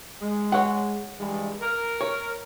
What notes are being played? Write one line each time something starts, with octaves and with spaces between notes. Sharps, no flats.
G#3
C#5 F#5
G2 E3 G#3
A#4
C#5